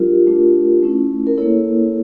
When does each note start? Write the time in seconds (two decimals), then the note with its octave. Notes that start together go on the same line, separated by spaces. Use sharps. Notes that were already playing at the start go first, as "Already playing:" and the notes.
Already playing: G3 D4 F4 G4 A#4
0.27 A3 D4 F4
0.82 A3 C#4 E4
1.27 A#4
1.38 A#3 E4 A4 C#5